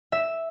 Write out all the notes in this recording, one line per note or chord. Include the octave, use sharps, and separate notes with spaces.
E5